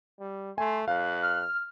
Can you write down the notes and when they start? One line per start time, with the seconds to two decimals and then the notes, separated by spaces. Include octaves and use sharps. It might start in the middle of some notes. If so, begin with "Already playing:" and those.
0.20 G3
0.58 A3 G#5 C6
0.88 F2 F5 F#6
1.22 F6